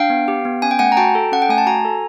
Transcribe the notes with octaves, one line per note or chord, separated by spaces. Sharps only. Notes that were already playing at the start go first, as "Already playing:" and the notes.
Already playing: D4 F5 G5
B3
G4
B3
C#4 G#5
G5
A3 F#5 G#5
A#5
F#4 G5 A5
A4
C#4 F#5
G5
A3 G#5
A5
F#4 G#5 A#5
A4